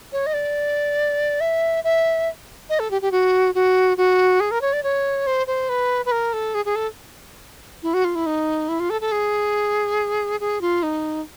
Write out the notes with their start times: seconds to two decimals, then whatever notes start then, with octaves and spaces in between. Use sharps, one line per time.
0.12 C#5
0.26 D#5
0.34 D5
1.41 E5
1.84 E5
2.70 D#5
2.80 A4
2.91 G4
3.02 G4
3.12 F#4
3.55 F#4
3.97 F#4
4.40 G#4
4.51 A#4
4.61 C#5
4.73 D5
4.83 C#5
5.27 C5
5.47 C5
5.69 B4
6.06 B4
6.12 A#4
6.33 A4
6.55 G#4
6.65 G#4
6.76 A4
7.83 E4
7.94 F#4
8.05 F4
8.15 E4
8.26 D#4
8.69 E4
8.80 F4
8.90 A4
9.01 A4
9.12 G#4
10.40 G#4
10.61 F4
10.83 D#4